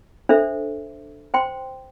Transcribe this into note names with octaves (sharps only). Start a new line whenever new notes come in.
D4 A4 C5 E5
C5 G5 C6